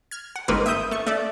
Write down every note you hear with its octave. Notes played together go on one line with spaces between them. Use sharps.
F6 G#6
F#5
G1 G#2 D#3 A#3 C4 B4
E5 D#6 G6 D#7
A3 C#6
A3 A4 D5